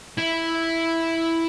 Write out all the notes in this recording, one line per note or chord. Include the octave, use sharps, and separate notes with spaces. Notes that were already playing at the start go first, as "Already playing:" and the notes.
E4